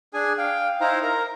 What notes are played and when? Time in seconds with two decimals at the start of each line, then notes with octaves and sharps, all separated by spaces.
0.14 D4 G#4 G#5
0.38 F5 G5
0.81 D#4 E4 C5 F5 A#5
1.03 A#4 A#5